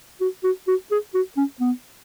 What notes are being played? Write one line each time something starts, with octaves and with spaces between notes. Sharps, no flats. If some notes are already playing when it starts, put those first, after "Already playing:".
F#4
F#4
F#4
G#4
F#4
C#4
B3